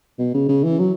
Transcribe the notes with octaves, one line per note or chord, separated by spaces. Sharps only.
B2
C#3
C#3
E3
F#3